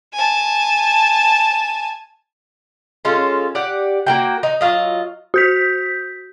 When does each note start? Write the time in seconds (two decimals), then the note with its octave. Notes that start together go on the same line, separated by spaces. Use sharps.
0.14 G#5 A5
3.05 G#3 C#4 F4 A4
3.55 G4 D5 F#5
4.06 A#3 F#4 G5
4.43 D#4
4.61 F#3 F4 D#5
5.34 F#4 G6 B6